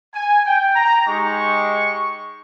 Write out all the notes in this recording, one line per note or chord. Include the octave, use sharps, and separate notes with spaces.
G#5
G5
A#5
G#3 D#4 G4 C#6